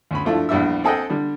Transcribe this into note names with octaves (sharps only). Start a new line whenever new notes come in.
D2 C#4 B5
F3 A3 D4 E4 F4
A#1 E2 G3 D4 E5 E6
C4 G#4 A4 D#5 F#5 G5
D3 G3 D4